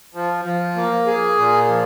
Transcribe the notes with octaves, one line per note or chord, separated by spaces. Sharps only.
F3
F3
A#3
G#4
A#2
F3